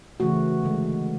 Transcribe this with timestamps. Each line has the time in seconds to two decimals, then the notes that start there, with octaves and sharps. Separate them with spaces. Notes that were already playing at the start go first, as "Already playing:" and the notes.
0.20 C#3 E3 A3 F#4
0.64 D3 G#3